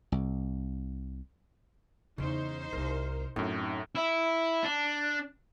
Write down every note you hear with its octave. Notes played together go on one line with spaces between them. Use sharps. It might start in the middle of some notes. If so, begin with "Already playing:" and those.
C2
E2 C#3 D#4 E4 C5
C2 C3 A#4
F#2 A2 C4 D#4
E4
D4